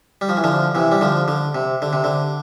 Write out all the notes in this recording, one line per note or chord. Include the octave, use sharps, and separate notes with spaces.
G3
F3
E3
D3 F3
C3 E3
G3
D3 F3
D3
C3
D3
C3
D3